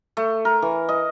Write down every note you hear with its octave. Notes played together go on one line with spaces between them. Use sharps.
A3
A#4
E3
D#5